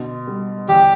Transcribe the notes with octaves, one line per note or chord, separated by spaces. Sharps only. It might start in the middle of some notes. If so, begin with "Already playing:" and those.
Already playing: B2 D3
G3
E2 G4